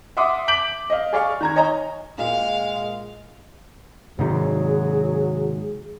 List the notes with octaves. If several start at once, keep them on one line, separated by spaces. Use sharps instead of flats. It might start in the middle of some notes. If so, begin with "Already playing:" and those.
E5 F#5 C6 D6 D#6
D6 G6 B6 D7 F#7
D#5 F5
G#4 D5 F5 C#6
D#3 A#5 G#6
C#5 D#5 G#5 A#5
A#2 G#3 F5
G#2 C3 D#3 F#3 G#4